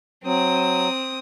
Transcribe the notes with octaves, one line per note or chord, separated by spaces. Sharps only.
F#3 C4 D#6